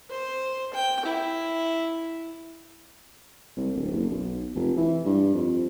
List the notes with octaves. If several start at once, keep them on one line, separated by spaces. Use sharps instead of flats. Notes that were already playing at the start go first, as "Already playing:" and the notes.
C5
G5
E4
C2
D1
F#1
B1
F1
E3
G2
F2